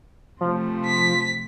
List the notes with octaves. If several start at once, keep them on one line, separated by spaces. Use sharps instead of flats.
C3 F3 A3
B6